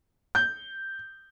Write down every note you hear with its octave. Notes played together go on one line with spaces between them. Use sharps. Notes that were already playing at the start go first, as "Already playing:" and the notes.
G6